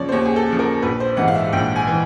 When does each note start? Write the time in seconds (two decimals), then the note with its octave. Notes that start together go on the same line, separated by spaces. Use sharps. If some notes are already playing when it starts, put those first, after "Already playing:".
Already playing: D#2 C#3 F3 C#5 D5
0.09 C5
0.12 D#2 C#5
0.25 G#4
0.36 A4
0.47 C#3 F3
0.59 A#4
0.82 A#1 B4
1.00 C5
1.17 G#2 E3 F#5
1.28 F5
1.35 E5
1.53 A#1 G5
1.76 G#5
1.87 E3